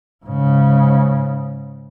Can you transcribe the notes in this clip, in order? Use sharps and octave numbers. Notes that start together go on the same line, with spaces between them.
G#2 C#3